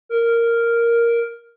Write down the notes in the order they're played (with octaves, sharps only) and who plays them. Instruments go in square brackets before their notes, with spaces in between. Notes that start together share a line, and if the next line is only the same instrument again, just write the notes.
[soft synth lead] A#4